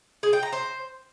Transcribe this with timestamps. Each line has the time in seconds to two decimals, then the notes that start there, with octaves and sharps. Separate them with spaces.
0.23 G#4
0.33 G5
0.43 A#5
0.52 C5